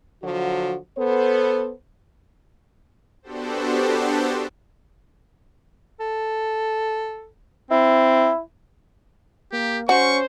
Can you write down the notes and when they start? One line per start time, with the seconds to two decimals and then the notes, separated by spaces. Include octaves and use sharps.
0.23 D3 F3 F#3 F#4
0.98 B3 A4 C5
3.22 B3 D4 F#4 G4 A4 C5
6.00 A4
7.71 C4 E4
9.52 A#3 G4
9.89 C#4 F#4 C5 C#6